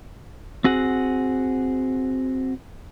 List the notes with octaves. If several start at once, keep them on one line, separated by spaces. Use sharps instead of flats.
C4 F#4 G#4 F#5